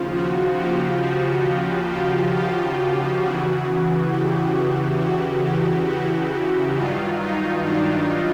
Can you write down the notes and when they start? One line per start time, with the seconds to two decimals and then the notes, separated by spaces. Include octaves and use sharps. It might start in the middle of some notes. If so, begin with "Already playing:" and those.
Already playing: D#2 C#3 F3 F4
0.14 F#4
0.58 G4
1.02 F#4
1.90 G4
2.35 G4
3.23 E2 C#3 E3 F#4
4.11 G4
4.56 F#4
5.00 F#4
5.44 G4
5.89 F#4
6.77 G2 D#3 F#3 F4
7.21 D#4
7.65 D4